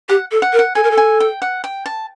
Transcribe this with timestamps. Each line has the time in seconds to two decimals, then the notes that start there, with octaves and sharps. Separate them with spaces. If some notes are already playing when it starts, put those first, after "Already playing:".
0.09 G4 F#5
0.31 A4
0.42 F#5
0.53 A#4
0.59 F#5
0.75 A4 G#5
0.83 A#4
0.91 A4
0.97 G#5
1.20 G5
1.42 F#5
1.64 G5
1.86 A5